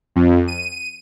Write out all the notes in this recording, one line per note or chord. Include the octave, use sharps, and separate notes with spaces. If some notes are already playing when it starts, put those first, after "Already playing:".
F2
D#7